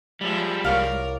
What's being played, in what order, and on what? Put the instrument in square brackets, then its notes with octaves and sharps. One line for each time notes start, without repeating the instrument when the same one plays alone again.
[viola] F3 E5 [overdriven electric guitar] G3 G#3
[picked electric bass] C2 [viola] A#4 [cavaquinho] C#5 D5 F5